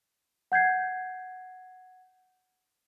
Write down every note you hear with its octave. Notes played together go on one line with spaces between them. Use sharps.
F#5 G6 G#6 C7